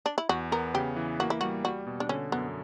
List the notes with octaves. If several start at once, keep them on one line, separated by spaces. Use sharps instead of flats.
D4
E4
E2 F#4
B3 A#4
C#3 G4
E3
A#3 F#4
E4
G3 F#4
G3 F#4
B2
D4
D3 C#4
F#2 B3